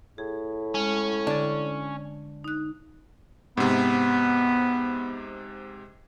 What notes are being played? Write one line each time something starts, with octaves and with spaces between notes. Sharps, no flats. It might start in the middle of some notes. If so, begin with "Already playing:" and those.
A2 G#4
G#3 C#4
D3 D4 A6
D#4 F#6
G#2 C3 B3